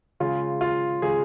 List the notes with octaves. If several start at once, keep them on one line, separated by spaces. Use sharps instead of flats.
C#3 G#3 F4
F4
C#3 G#3 G#4